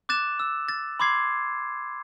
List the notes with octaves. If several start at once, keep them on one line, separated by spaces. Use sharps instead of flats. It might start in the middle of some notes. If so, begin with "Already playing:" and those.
D6 F#6 A6 E7
E6
A6
B5 C6 D6 G#6 C7